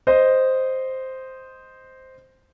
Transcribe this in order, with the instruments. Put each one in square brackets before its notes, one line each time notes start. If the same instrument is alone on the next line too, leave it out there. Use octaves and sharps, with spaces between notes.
[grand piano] C5 D#5